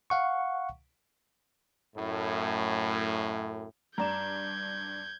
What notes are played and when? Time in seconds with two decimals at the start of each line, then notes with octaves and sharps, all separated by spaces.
0.10 F5 F#5 C#6
1.96 F#2 A2
3.98 G2 D5 A#5 G6 G#6 E7